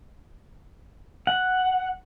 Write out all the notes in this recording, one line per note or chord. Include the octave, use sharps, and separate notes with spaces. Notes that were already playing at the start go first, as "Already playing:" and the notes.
F#5